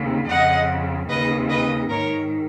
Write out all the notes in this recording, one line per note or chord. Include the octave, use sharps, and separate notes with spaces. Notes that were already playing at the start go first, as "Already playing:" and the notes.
Already playing: D#2 C#3
F2 C#3 D#5 F#5
D#2 C#3 B4 D#5
B4 D#5
G#2 D#3 A#4 C#5